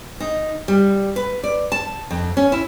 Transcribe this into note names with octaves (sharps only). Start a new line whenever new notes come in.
D#4
G3
B4
D5
A5
F2
C#4
E4